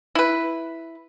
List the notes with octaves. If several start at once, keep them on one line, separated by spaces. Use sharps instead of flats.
E4 B4